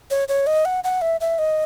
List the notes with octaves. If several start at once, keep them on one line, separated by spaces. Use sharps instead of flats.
C#5
C#5
D#5
F#5
F#5
E5
E5
D#5